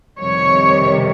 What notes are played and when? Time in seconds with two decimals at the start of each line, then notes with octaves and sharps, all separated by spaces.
0.18 F2 C3 D#3 G3 C#5